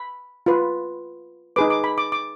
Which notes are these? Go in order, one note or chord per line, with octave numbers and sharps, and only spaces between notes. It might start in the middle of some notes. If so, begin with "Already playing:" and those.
Already playing: B5
F4 B4
D#4 G#4 B4 D6
D6
B5
D6
D6